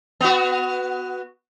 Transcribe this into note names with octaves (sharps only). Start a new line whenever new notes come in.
B3 F#4